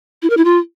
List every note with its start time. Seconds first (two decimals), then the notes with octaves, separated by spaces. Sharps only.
0.22 E4
0.30 A#4
0.37 E4
0.45 F4